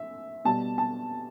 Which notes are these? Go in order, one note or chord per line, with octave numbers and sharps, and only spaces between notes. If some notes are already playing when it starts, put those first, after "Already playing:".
Already playing: E5
B2 G3 A5
A5